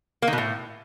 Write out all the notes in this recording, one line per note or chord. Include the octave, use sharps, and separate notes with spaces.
A#3
D#3
B2
A2